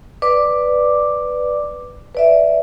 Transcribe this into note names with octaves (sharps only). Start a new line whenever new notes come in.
B4 D5 D6
B4 D5 E5